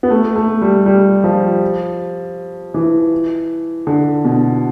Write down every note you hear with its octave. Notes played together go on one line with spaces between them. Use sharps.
B3
A3
A3
G3
G3
F3
E3
D3
B2